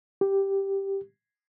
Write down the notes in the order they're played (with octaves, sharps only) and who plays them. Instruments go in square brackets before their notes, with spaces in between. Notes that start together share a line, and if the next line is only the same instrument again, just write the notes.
[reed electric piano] G4